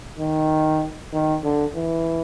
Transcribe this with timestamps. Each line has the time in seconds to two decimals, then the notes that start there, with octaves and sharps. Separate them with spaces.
0.19 D#3
1.13 D#3
1.43 D3
1.75 E3